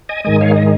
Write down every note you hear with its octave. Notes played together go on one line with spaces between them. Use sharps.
D#5 G#5
G#2 D#3 G#3 D#5 G#5
C#5 F5
D#5